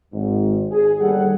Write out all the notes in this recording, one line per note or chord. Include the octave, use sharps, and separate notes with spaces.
G#1 G#2
G#4
G1 D#2 G3 G#4 A4 F#5